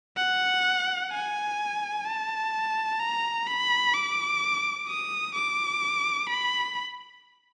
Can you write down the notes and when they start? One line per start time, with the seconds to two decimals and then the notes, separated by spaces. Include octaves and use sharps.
0.17 F#5
1.11 G#5
2.05 A5
3.00 A#5
3.47 B5
3.94 D6
4.88 D#6
5.35 D6
6.29 B5